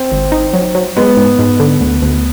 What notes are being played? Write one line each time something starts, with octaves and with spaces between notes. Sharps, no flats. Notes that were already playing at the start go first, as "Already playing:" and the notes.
Already playing: C4
G#1
D#4
F#3
F#3
G#3 B3
G#2
G#2
D3
D2
D2